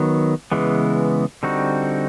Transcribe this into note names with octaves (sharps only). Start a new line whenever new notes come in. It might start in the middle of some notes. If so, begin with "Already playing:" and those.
Already playing: D#3 F#3 B3
C#3 E3 G#3 B3
D3 G3 C4 D#4 F#4